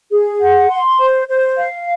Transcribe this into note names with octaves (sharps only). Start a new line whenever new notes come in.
G#4
F#5
C6
C5
C5
F5